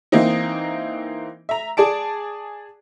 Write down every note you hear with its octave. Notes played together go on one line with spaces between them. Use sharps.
E3 A#3 C4 D#4
E5 A#5
G#4 D5 A5 D7